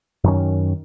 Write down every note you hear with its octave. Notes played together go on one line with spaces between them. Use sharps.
F#2 D#3 C#4